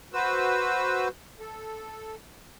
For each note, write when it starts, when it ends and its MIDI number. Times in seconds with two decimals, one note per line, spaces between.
0.13 1.08 66
0.13 1.08 71
0.13 1.08 72
0.13 1.08 88
1.40 2.15 69